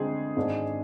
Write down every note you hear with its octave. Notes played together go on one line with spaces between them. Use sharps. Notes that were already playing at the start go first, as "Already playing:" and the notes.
Already playing: D2 D3 G#3 C4 G#4
G#1 G#2 G#3 D4